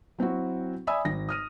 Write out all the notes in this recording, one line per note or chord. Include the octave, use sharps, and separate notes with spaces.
F#3 C4 E4 F#4
D5 E5 G#5 B5 D#6 E6
G#1 A#6
D#6 F6 D#7